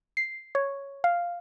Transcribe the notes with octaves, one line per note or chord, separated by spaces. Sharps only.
C7
C#5
F5